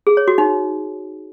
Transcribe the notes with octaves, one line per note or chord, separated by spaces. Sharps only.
G#4
C#5
F#4
D#4